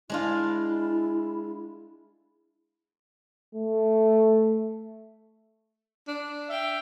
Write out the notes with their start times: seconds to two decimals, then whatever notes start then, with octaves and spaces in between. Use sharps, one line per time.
0.10 G#3 D4 E4 F4
3.55 A3
6.08 D4
6.49 E5 F5 G5